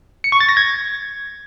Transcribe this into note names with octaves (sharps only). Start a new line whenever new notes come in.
C#7
C#6
A6
A#6
G#6